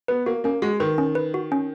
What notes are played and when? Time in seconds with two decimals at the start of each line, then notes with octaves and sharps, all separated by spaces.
0.08 B3 B4
0.26 A#3 F#4
0.44 A#3 C#4
0.62 G#3 F#4
0.80 D#3 B4
0.98 C#4
1.15 B4
1.34 F#4
1.52 C#4